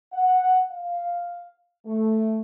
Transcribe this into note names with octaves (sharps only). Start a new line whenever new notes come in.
F#5
F5
A3